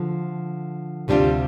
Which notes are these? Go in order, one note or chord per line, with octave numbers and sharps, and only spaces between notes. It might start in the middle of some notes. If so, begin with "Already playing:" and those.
Already playing: D3 F3
D2 C3 G3 D4 F4